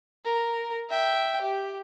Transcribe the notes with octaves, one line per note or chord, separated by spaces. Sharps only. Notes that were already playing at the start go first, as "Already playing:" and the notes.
A#4
E5 G5
G4